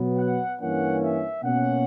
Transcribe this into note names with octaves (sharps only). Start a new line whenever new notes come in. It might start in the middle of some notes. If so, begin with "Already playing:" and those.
Already playing: B2 F#3 B3
F#5
G2 E3 A#3 C#4 F#5
E5
B2 A#3 C#4 F#5